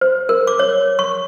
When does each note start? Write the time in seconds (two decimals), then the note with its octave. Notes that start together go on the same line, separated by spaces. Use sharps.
0.01 C5
0.29 A#4
0.47 D6
0.59 C#5
0.99 C#6